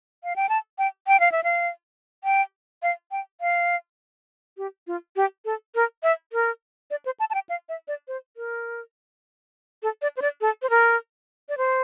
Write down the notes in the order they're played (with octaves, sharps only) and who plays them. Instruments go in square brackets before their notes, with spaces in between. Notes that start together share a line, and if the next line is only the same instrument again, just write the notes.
[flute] F5
G5
A5
G5
G5
F5
E5
F5
G5
F5
G5
F5
G4
F4
G4
A4
A#4
E5
A#4
D5
C5
A5
A5
G5
F5
E5
D5
C5
A#4
A4
D5
C5
D5
A4
C5
A#4
D5
C5